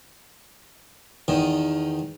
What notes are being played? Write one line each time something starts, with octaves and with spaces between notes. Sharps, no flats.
E2 D#3